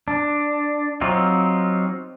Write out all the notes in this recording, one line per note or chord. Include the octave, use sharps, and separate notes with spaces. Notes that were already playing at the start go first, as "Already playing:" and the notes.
D4
F#3 C4 D#4 F4 G4